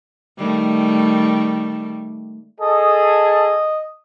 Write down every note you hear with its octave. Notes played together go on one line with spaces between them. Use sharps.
D#3 G3 A3
G#4 A4 D#5